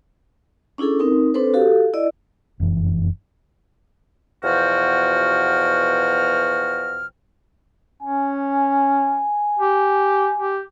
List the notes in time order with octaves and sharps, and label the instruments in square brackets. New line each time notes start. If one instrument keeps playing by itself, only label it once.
[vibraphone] C#4 D4 E4 G#4 A4
C4 D#4 A#4
C4 D4 A4 B4 C5
F#4 G4 A4 F5
E4 D5 D#5
[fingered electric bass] F1 F#2 E3
[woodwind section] E2 B2 F3 F#4 G5 F6
[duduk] C#4 [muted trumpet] G#5
[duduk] G4
G4